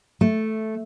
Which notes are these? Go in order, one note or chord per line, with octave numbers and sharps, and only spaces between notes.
A3